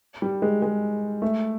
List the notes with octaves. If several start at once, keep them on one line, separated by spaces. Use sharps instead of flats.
G3
G#3
G#3
A3